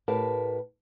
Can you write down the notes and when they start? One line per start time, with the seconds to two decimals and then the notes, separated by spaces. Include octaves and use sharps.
0.08 A2 G4 A#4 B4 A5